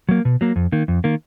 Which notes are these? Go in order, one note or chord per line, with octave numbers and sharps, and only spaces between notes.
F#3 A#3
B2
F#3 A#3
F2
D#3 A#3
F2
D#3 A#3